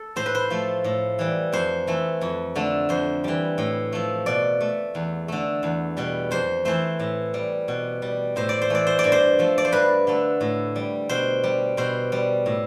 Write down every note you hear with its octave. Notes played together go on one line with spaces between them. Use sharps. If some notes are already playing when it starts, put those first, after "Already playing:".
Already playing: A4
A2 C5
B4
C5
F3 A3
A2
E3 G3
F2 C5
E3 A3
F2
D3 A3
F2 C5
E3 G3
A2
F3 A3
B2 D5
A3
E2
D3 A3
E2
B2 G3
F2 C5
E3 A3 C5
A2
G3
B2
G3
A2 C5
D5
C5
E3 A3 D5
C5
D5
G2
C5
F3 A3
D5
C5
G2 B4
D3 A3
A2
G3
B2 C5
G3
B2 C5
G3
A2